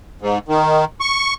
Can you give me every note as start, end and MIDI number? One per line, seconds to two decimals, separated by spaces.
0.22 0.38 44
0.48 0.85 51
1.00 1.34 85